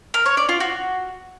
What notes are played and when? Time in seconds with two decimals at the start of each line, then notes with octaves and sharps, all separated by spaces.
0.14 A#4
0.26 C#5
0.37 D5
0.49 F4
0.60 F#4